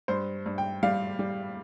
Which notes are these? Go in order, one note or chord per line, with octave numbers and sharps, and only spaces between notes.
G2 C5
G2
G5
G3 F5
G3